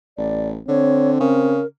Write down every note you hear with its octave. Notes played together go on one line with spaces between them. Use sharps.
A1 D5
D3 C4 C#5
C#3 A#4